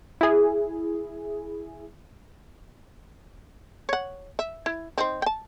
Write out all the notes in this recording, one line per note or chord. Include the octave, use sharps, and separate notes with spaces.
E4 G#4
C#5 F#5
E5
E4
C4 D#4 C5
G5 A5